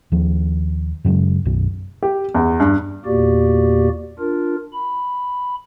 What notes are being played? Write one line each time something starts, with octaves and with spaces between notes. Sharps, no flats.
D#2 F3
F#2 C#3 F#3 G#3
B1 F#2 B2
G4
E2
G2
E2 A#2 A#3 F#4 G4 D5
D4 F4 A#4
B5